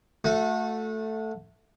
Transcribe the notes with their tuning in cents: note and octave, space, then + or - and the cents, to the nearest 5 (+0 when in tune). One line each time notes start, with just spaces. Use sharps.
A3 +0 F#4 -30